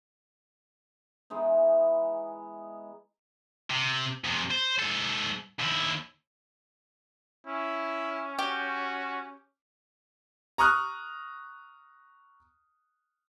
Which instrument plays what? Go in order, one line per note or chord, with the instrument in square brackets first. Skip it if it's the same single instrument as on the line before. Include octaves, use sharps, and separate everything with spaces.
[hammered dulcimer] E3 G#3 B3 D#4
[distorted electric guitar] C3
F2 C3
C5
G#2 A4
D#2 E4
[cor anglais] C#4 [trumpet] E4
[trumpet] F#4 [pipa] G4
[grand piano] A#5 C#6 D#6 F6 F#6